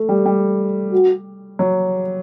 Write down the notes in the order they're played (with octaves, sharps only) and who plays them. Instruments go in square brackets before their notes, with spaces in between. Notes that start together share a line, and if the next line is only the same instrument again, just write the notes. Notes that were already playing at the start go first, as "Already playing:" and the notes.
Already playing: [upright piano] A3
G3
G3
[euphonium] F#4
[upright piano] F#3